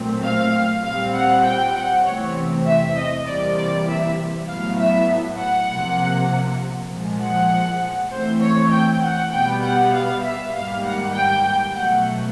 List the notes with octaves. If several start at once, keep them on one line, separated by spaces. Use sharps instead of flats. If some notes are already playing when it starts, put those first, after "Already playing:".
Already playing: A#2 F#3 A3 C4
F5
A#2 G3 C4 F5
F#5
G5
F#5
E2 C3 E3 A3 C4 C#5
E5
D#5
C3 E3 G3 A#3 D5
D5
E5
A2 F#3 B3 F5
E5
F#5
C3 F3 A#3
A#2 F3 G#3
F#5
C#3 E3 A3 C4 C5
C#5
G5
F#5
B2 G3 B3 G5
F#5
F5
E5
G#2 D#3 G3 A#3 F5
F#5
G5
G5
B2 F#3 A3 F#5